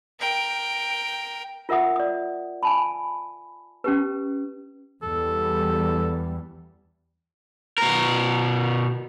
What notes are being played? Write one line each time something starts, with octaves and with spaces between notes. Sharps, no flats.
A#4 G5
F4 A#4 E5 F#5 D#6
D5 D#6
G#5 A5 B5
C#4 G4 B4
E2 G3 A4
B2 A#4